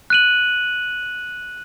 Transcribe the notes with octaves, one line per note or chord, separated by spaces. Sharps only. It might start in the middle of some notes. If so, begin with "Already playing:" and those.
F#6 D#7 F#7